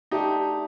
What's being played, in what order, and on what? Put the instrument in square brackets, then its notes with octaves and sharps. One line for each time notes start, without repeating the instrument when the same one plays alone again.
[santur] A3 D4 A4 [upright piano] D#4 G4